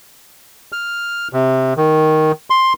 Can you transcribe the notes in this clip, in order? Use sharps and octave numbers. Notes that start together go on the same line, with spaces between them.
F6
C3
D#3
C6